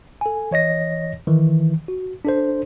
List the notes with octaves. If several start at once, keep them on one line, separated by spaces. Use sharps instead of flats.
A4 G#5
E3 C#5 D#5 A#6
D#3 E3
F#4
D4 A4 C5